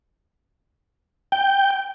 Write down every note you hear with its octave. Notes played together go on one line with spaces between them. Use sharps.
G5